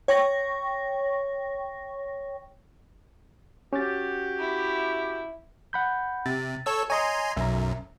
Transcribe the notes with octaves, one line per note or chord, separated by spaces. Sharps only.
C#5 G5 C#6 A#6
C#4 F#4 G4 A6
E4
F#5 B5 G6
C3 A6
A4 C#5 E6
C#5 D#5 G#5 A#5 C6 D#6
B1 F#2 E5 A#5